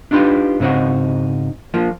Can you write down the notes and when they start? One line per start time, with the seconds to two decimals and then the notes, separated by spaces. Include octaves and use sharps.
0.11 D4 D#4 F4 G4 B4
0.60 G#2 C#3 C4 D#4 F#4
1.74 F3 A#3 F4